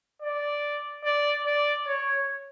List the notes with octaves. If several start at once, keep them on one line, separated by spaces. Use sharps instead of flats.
D5
D5
D5
C#5